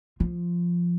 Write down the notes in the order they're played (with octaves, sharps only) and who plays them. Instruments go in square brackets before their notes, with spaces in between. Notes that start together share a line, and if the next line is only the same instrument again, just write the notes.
[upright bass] F3